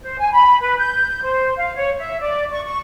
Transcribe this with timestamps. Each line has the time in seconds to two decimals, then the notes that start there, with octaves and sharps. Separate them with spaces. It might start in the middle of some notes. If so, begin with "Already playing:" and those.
0.01 C5
0.19 G#5
0.32 B5
0.60 B4
0.78 G6
1.22 C5
1.57 F5
1.75 C#5
1.98 E5
2.20 D5
2.50 C#6
2.64 C#6